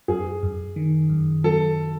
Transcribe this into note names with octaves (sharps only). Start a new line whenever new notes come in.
F#2 G#4
F#2
D#3
F#2
F#3 A4